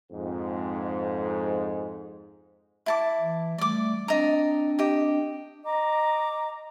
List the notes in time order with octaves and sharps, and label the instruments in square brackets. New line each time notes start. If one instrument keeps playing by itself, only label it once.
[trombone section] F2 G#2
[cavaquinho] E4 A5 D6
[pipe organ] E3
[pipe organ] G3 A3 [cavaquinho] D5 D6
[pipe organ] C4 D4 [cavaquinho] D5 D#5 A#5
[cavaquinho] G4 D#5
[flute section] D#5 A#5 D6